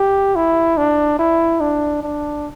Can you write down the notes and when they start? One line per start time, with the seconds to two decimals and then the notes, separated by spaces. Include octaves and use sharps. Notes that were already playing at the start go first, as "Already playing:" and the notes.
Already playing: G4
0.36 E4
0.77 D4
1.19 E4
1.61 D4
2.03 D4